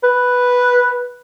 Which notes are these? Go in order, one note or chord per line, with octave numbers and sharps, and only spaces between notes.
B4